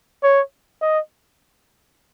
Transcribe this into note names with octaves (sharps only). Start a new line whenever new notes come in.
C#5
D#5